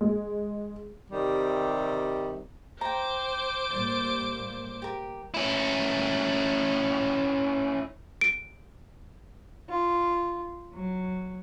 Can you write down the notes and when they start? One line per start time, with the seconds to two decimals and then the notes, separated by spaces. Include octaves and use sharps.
0.01 G#3
1.11 C3 D#3 G3
2.81 C5 G5 A#5 D6
3.71 A2 G3 A#3 D5
4.82 G4 A#4
5.34 C#4 E4
8.21 D7
9.70 F4
10.74 F#3